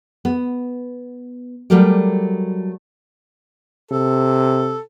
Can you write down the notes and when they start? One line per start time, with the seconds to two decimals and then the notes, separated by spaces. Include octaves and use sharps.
0.25 B3
1.70 F#3 G3 A3 G4 A#4 D5
3.91 C3 A4